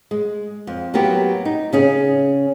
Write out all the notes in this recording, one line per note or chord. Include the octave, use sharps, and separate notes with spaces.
G#3
F2
F#3 A#3 B3 G4
D#4
C#3 C#4 G#4